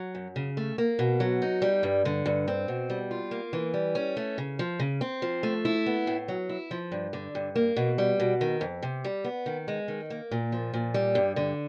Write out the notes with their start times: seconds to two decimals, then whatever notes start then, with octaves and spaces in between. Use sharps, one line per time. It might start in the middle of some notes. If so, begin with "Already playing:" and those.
Already playing: F#3
0.15 F#2
0.36 C#3
0.57 A3
0.78 A#3
0.99 B2
1.20 F#3
1.42 D#4
1.62 G3
1.83 G2
2.05 D3
2.26 G2
2.48 C4
2.68 B2
2.90 G3
3.11 F4
3.31 A#3
3.53 E3
3.74 G3
3.95 C#4
4.17 A3
4.38 C#3
4.59 F3
4.80 C#3
5.01 C4
5.22 F3
5.43 A3
5.65 E4
5.86 B3
6.07 A2
6.28 F#3
6.49 E4
6.71 F3
6.92 G2
7.13 D3
7.35 G2
7.56 A#3
7.76 B2
7.98 G3
8.20 B2
8.41 D#3
8.61 F2
8.82 C3
9.04 G3
9.24 B3
9.46 D#3
9.68 G#3
9.88 D#3
10.10 A#3
10.31 A#2
10.52 F3
10.74 A#2
10.94 G3
11.15 G2
11.36 D3